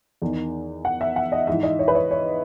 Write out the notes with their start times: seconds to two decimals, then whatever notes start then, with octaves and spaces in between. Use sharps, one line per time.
0.22 E2 D#3
0.85 F#5
1.01 E5
1.16 F#5
1.32 D#5
1.47 G#2 E3 E5
1.63 D#5
1.79 C#5
1.88 B4
1.95 C#5
2.11 C#5